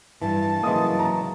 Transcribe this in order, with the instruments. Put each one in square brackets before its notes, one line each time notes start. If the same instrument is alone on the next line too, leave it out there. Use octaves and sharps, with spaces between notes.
[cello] G2 [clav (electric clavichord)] E3 [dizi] A5
[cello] C#3 F#3 [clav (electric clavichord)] E3 G#3 A#3 [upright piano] D#6
[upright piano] A#5